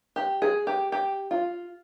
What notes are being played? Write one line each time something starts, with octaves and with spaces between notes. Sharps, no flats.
G4
G#4
G4
G4
F4